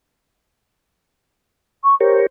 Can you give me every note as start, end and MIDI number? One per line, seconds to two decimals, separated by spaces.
1.84 1.95 85
2.00 2.26 67
2.00 2.26 70
2.00 2.21 72
2.00 2.26 73